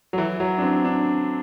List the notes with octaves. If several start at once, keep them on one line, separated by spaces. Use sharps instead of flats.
F#3
E3
F#3
D4
C4
D4